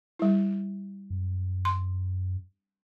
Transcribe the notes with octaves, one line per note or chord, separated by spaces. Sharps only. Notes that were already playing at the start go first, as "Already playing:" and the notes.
G3 E4
F#2
C6